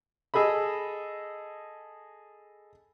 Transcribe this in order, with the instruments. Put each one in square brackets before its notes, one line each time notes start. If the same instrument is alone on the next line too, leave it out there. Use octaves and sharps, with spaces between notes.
[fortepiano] G#4 A4 D#5 B5